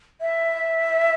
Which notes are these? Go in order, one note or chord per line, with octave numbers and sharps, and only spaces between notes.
E5